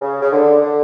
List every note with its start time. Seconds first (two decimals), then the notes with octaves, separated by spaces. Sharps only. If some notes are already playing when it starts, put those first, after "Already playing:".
0.02 C#3
0.22 C#3
0.32 D3
0.62 D3